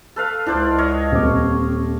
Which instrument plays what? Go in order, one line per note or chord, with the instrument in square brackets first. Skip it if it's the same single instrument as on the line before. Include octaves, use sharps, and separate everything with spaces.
[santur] A4 B4 F5
[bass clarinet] C#2 [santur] D4 C5 D5 [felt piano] E4
[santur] C#5 D#5 F5
[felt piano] D#1 C4 D6